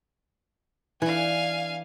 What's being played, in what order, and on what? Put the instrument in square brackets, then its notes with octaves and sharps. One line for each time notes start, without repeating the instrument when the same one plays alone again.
[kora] E3 [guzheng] B3 D4 [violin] F5 G#5